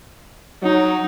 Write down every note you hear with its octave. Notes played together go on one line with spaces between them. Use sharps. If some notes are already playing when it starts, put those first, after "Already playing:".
F#3 D#4